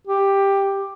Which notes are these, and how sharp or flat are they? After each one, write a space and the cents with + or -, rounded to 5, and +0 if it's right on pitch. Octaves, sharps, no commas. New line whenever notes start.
G4 +10